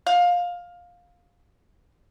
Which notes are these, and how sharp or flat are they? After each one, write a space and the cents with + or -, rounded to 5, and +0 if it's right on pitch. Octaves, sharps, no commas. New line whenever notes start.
F5 +15